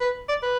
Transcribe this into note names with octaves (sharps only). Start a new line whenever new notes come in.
B4
D5
B4